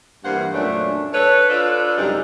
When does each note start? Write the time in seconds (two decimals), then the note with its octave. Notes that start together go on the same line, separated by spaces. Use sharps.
0.24 G2 E3 A#3 C5 F#5
0.54 F#2 A#2 A3 C#4 D4
1.13 A4 B4 C#5
1.49 D4 F4 A4 B4 C5 D5
1.98 F#2 C3 G3 G#3 C#4 D#4